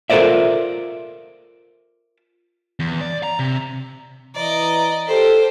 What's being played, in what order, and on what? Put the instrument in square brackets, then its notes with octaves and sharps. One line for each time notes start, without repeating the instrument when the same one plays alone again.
[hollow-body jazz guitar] F4 A4 A#4 C5 D5 E5
[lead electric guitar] E2
D5
A#5
C3
[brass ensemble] E3 A#5 [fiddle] D5 D#5
[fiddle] G4 C5 [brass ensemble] A4